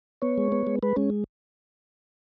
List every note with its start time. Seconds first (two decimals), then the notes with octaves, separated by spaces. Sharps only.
0.22 B3 C#5
0.38 G#3
0.52 B3
0.67 G#3
0.83 G#3 B4
0.96 G#3 C#4